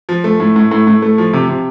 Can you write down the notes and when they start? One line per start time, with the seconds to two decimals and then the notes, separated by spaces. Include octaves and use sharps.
0.09 F3
0.24 A3
0.40 A2
0.56 A2
0.71 A2
0.87 A2
1.02 A3
1.18 F3
1.33 C3
1.49 C3